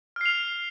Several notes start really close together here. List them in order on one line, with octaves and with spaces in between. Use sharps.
F6 C7 F7